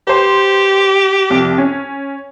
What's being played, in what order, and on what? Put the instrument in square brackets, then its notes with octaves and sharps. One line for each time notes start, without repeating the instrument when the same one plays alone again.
[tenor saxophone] G4 [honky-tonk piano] B4 C5
[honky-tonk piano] C2 F2
C#4